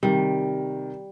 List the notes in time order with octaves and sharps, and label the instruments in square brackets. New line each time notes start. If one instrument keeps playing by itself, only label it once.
[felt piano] C3 D#3 [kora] G3